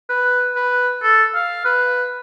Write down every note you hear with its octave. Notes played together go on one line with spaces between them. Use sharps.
B4
B4
A4
F5
B4